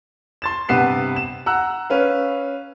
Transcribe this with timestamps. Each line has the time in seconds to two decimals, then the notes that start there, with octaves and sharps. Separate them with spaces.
0.42 C6 A6 E7
0.69 G2 C3 B3 B4 C7 E7
1.16 E7
1.46 F#5 A#5 E6 F#6
1.90 C#4 B4 F5